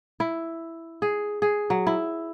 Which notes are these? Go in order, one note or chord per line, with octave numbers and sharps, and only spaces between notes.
E4
G#4
G#4
F#3
E4